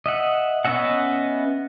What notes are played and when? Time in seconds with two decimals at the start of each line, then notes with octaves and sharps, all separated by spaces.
0.06 D#5 E5 F#5
0.65 B3 C#4 D#5 E5 F#5